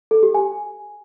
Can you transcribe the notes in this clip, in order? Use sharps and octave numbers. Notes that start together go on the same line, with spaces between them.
A4
G4
G#5